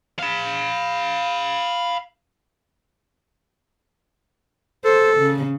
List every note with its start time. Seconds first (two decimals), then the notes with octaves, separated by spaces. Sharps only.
0.19 F5 B5
4.84 A4 C5
5.16 C#3